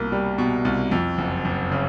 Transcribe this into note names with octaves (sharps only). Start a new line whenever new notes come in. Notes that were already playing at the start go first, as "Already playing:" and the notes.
Already playing: C2 B2 A#3
G3
B2
C2
F2
F#1
F#1
C#3